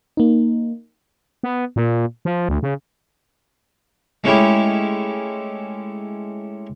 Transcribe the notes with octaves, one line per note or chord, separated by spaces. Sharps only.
A#3 D#4
B3
A#2
F3
D2
C#3
G#3 A3 C#4 E4 G4